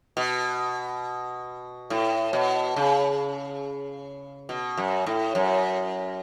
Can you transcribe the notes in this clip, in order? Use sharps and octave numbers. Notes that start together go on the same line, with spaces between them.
B2
A2
B2
C#3
B2
F#2
A2
F#2